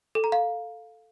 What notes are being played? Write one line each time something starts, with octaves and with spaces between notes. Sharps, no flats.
A4
A#5
F5